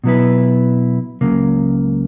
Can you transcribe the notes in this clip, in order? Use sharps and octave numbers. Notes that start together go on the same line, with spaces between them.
B2 F#3 B3 E4 B4
C#2 C#3 F#3 A#3